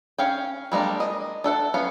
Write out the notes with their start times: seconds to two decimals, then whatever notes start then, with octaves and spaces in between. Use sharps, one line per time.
0.18 C#4 F5 G5
0.72 G3 G#3 A#3 D4
1.00 D#5
1.44 D4 A4 F#5
1.74 B3 C#4 F5